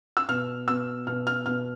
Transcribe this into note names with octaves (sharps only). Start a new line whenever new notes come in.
E6
B2 F6
B2 E6
B2 F6
F6
B2 F6